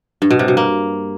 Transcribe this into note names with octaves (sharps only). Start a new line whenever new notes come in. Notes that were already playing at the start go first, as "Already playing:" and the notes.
G2
B2
C3
B2
A#3